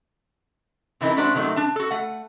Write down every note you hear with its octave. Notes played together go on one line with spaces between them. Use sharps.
C3 E3 D#4 E4 A#4
A3 D4 F#4 C5
C3 D#3 F#3 G#3 A3
D4 A5
F#4 A4
A3 F#5